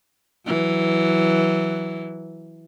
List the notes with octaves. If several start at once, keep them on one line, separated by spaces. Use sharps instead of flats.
E3 F#3